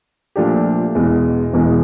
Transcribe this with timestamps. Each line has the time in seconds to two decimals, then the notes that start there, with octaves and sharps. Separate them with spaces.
0.36 A#2 F3 A3 D4 G4
0.95 E1 E2 B2 G#3
1.53 E1 E2 B2 G#3